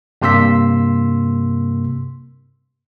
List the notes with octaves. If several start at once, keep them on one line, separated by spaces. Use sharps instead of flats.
G2 C3 A#3 C6 E6 B6